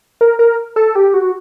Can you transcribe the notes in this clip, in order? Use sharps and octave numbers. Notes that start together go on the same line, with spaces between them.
A#4
A#4
A4
G4
F#4